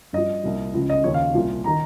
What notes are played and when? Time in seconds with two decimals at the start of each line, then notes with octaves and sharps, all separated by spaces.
0.13 G2 F3 D#5
0.43 C2 A#2 F3
0.74 C#2 C#3 F3
0.90 D#5
1.04 D#2 C#3 F3 C#5
1.14 F5
1.34 C2 A#2 F3
1.64 D#3 A#5